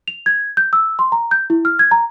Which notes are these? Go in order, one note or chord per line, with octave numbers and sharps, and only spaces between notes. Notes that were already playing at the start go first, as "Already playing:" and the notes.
F7
G#6
G6
E6
C6
A#5
G6
E4
F6
G#6
A#5